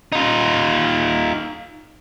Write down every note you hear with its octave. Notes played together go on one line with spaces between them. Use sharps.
D#4 F4